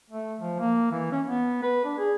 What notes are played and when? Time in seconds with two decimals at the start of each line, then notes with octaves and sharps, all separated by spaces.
0.10 A3
0.40 F3
0.59 A#3
0.91 E3
1.11 C#4
1.25 B3
1.63 B4
1.84 D4
1.98 G#4